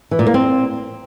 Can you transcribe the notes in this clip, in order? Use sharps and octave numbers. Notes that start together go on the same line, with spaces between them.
E3
A#2
A#3
C4